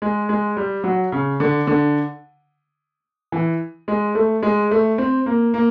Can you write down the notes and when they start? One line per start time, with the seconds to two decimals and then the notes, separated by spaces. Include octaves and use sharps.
0.02 G#3
0.29 G#3
0.57 G3
0.84 F#3
1.12 C#3
1.40 D3
1.67 D3
3.32 E3
3.88 G#3
4.15 A3
4.43 G#3
4.71 A3
4.98 C4
5.26 A#3
5.54 A#3